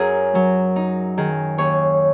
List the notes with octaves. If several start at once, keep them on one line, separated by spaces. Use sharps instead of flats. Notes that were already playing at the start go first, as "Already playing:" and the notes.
Already playing: F#2 F#3 F#4 G#4 A#4
F#3
D#4
D#3 G#4
D#2 G#4 C#5